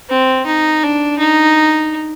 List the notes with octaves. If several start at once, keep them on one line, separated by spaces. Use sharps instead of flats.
C4
D#4
D4
D#4